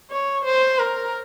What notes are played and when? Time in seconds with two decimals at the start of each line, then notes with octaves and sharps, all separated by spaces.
0.11 C#5
0.45 C5
0.79 A#4